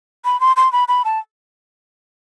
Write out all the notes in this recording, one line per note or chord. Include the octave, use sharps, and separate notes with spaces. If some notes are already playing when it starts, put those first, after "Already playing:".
B5
C6
C6
B5
B5
A5